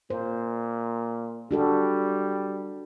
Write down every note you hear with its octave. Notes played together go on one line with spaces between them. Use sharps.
A#2 C5
G3 D4 F#4 A4